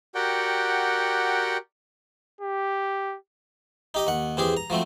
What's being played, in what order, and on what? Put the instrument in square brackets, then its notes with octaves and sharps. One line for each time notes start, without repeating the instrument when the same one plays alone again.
[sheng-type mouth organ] F#4 G4 A#4 D5 F#5 G5
[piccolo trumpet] G4
[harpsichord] D#4 G4 D#5
D#2 F#5
E2 C4 G4 G#4
A#5
F3 F#3 A3 C4